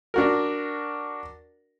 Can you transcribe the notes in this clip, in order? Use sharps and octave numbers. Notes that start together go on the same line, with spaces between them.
D4 F#4 A#4